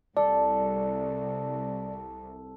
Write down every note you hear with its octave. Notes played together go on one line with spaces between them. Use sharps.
C2 A4 D5